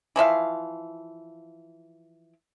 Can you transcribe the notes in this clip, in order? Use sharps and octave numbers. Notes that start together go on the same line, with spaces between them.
E3 F3 E5 F5